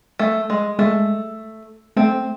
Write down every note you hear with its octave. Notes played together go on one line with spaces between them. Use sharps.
A3
G#3
G#3 A3
A3 C4